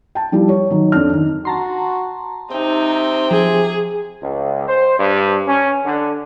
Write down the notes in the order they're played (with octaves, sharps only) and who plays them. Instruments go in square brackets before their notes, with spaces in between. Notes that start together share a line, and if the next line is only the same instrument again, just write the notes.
[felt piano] G5 A5
F3 G3 E4
C#5
D#3 F#3
F2 D4 F6
D#3
[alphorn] F#4 [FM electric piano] A5 A#5 C6
[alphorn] C3 [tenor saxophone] C4 [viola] D#4
[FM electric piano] F3 [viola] G#4
[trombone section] C#2
C5
G2
C#4
D3